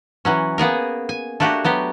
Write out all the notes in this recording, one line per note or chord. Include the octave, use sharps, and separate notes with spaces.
E3 F#3 C#4
A#3 B3 G#4 A#4
G#5
A3 A#3 D4 F#4 G4
F#3 B3 G4